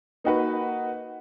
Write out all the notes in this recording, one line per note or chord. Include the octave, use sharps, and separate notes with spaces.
A#3 D#4 F#4 B4